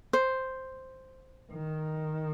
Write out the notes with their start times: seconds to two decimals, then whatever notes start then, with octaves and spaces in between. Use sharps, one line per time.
0.13 C5
1.53 D#3